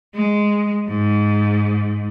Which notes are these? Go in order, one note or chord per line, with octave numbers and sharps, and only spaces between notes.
G#3
G#2